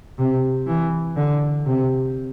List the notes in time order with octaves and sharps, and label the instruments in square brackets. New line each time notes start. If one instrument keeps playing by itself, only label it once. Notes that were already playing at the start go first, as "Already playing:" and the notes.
[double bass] C3
E3
D3
C3